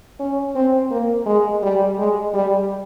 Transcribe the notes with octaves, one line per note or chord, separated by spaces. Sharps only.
C#4
C4
A#3
G#3
G3
G#3
G3